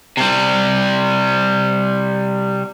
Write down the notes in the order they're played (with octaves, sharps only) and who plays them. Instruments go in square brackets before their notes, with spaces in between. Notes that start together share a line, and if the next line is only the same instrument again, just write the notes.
[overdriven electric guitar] C3 G3